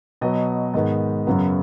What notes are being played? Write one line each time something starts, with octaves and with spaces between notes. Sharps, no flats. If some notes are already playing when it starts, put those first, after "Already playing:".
B2 F#3 B3 D#5
G#2 D#3 G#3 B3 D#5
F#2 C#3 F#3 B3